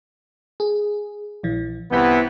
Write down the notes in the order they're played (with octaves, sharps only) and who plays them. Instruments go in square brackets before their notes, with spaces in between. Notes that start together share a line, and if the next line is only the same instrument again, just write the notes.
[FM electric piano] G#4
A#1 E3
[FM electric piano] C2 G6 B6 [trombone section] C3 E3 B3